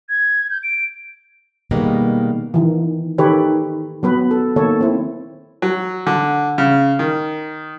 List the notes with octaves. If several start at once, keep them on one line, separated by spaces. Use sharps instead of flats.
G#6
G6
D7
B2 D#3 G3 G#3 A#3 B3
D#3 E3
D#3 D#4 G4 A4 B4 C#5
F#3 B3 B4
A4
D#3 A#3 A4 C#5
C4 E4
F#3
D3
C#3
D#3